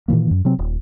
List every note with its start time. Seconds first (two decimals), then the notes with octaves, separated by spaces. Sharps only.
0.08 A#2 D#3 E3 A#3
0.31 F#2
0.45 C3 F#3 C4
0.59 D#1